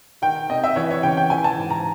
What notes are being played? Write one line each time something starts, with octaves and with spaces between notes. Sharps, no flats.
D#3 G5
C3 D#5
E5
E3 C#5
C#5
C#3 G5
G5
E3 G#5
A5
G#2
A#5